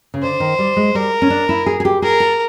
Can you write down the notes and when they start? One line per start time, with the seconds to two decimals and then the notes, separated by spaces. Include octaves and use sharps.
0.14 C#3
0.22 D3 C5
0.40 D#3
0.59 G3
0.77 G#3
0.95 G3 A#4
1.22 C#4
1.30 D4
1.49 E4
1.66 G#4
1.80 G#4
1.85 G4
2.02 G#4 A#4
2.20 A4